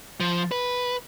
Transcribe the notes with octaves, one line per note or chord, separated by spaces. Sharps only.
F3
B4